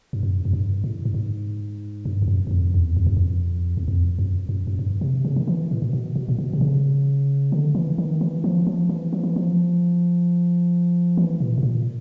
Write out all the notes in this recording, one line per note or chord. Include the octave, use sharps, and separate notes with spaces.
G2
F#2
F#2
G2
A2
G2
G#2
G2
F2
F#2
F#2
F2
E2
F2
F#2
F2
E2
F2
F#2
F#2
F#2
G2
C3
C#3
D#3
E3
A2
A#2
B2
B2
A#2
B2
C3
C#3
D3
E3
D#3
E3
F3
F3
E3
F3
E3
F3
E3
A#2
A2
A#2